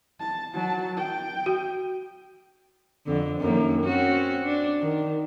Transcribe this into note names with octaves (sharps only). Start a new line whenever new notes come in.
A5
F#3 A5
G5
F#4
F2 D3
F#2 D#3 A#3
C4 C#4 F#4
D4
D#3